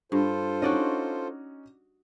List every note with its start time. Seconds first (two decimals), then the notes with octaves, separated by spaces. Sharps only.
0.12 G2 F4 A4 C5
0.62 C#4 D#4 F#4 D5 D#5